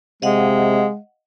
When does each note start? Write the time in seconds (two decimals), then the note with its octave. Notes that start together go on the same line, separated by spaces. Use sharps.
0.22 C3 G#3 D#5 F5 F#5